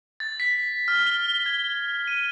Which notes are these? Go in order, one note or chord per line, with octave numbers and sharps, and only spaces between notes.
A6
B6
F6
G7
G#6
D#7